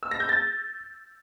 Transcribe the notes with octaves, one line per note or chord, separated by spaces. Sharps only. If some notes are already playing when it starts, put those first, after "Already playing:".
E6
A#6
G6
A6